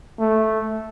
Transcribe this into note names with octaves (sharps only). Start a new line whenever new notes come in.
A3